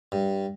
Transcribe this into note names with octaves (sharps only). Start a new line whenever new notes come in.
G2